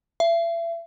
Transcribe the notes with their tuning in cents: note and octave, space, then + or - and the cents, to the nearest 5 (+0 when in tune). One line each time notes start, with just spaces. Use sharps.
E5 +35